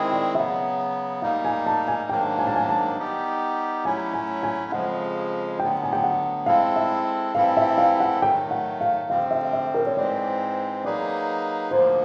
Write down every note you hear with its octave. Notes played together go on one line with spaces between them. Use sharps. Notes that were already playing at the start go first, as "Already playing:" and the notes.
Already playing: D#3 G#3 C4 E4 G#4
D5
C#3 F#3 B3 E5
G3 A#3 D#4 F5
G#5
A5
G#5
G#2 D#3 F#3 A#3 D4 G5
G#5
A5
G#5
A5
G3 B3 D#4 G4
F#3 A3 C#4 E4 G#5
G#5
G#5
F2 C#3 F3 G#3 F#5
D2 D3 F#3 B3 G5
G#5
G5
F#5
G#3 C4 E4 A4 F5
E5
E3 G3 C4 E4 A4 F5
E5
F5
F#5
D#3 F#3 A3 G5
F#5
F5
F2 D3 G3 C4 F5
E5
E5
A#4
C#5
G#2 E3 G#3 C4 D5
F#3 A#3 D#4 G#4 B4 D5
D2 D3 F3 A#3 C5